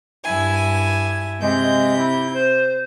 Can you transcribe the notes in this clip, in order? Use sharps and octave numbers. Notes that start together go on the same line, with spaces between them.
G2 E4 G#5
C3 G#3 G6
E4
C5